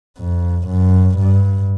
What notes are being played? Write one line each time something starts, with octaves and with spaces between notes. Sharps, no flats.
F2
F#2
G2